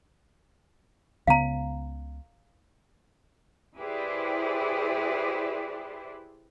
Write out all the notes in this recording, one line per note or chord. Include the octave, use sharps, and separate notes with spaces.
C#2 C#3 B3 F5 A#5
E4 G4 G#4 B4 C5 D5